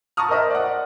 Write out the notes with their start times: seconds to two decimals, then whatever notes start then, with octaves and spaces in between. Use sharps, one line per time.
0.17 A5 A#5 C#6 D#6 F6
0.28 A#4 C5 D#5 E5
0.50 D5 F#5